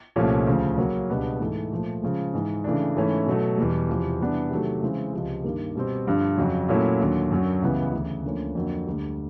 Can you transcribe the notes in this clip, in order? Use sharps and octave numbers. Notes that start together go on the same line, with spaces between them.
C2 A#2 F3 A3 C#4
D2 C#3 F3
C#3 F#3 A#3 C#4
C#2 B2 G3 B3 D4
G#2 E3 A3
A#2 F3 A3
C#3 F3 G#3
G#2 E3 G#3
C#3 E3 A3 D4
G#2 E3 A3 C#4 E4
B2 F#3 A3
E2 B2 G3
E2 C3 F3
C3 E3 G3 B3 D4
C3 D#3 F#3 A3
C#3 E3 G#3 C4
C#2 C3 F3
G2 D#3 G3 A#3
B2 G3 C4
G2 D3 F3
F2 C#3 F#3
A#2 F#3 A3 C#4 E4
D#2 D3 F#3
F#2 D3 F#3
C#2 C#3 E3 G3 B3
D2 C#3 E3
D2 D3 F3 A#3 C#4
F2 D3 F#3 A#3
D2 D3 G3